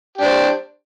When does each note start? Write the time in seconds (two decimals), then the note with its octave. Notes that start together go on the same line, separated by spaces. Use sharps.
0.18 G4
0.21 D4
0.25 C5